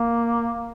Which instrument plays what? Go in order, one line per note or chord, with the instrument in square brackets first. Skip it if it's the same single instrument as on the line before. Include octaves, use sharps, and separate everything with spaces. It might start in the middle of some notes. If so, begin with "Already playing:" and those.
Already playing: [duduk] A#3